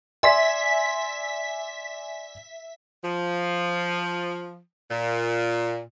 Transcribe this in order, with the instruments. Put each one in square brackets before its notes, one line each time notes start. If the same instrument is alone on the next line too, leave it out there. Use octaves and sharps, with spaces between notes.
[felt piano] D5 G#5 C6 [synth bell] E5 B6
[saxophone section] F3
A#2